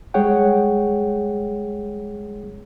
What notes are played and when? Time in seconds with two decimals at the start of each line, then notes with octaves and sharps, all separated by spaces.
0.14 G3 G#3 G#4 C#5 F#5 G5